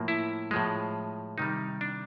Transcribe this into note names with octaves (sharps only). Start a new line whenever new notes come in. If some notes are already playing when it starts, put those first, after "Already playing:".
Already playing: A2 F3 A#3
E4
A2 F3 G#3
C3 D#3 G3 D#4
D4